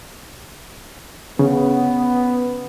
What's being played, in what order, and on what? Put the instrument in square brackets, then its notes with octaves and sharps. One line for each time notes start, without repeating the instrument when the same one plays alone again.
[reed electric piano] C#3 [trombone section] B3